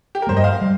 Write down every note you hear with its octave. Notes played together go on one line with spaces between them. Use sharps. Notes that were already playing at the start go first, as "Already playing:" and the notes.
G4
A#4
G2 G3 A#3 C5
D#5
F5
G3